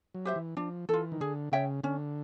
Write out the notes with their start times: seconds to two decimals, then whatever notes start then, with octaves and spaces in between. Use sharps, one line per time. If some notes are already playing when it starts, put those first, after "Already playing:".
0.15 F#3
0.25 G4 C5 E5
0.36 E3
0.57 F3 D4
0.89 E3 F4 A4
1.12 D#3
1.21 D3 G#4
1.52 C#3 C#5 E5 G5
1.83 D3 C#4